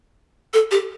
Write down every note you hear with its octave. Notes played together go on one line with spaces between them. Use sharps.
A4
G4